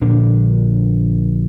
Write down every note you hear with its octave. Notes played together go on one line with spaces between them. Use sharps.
A#1 A#2 D3 D4